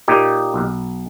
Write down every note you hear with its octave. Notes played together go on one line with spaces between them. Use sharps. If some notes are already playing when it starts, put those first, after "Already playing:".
A#2 D#4 G4
B1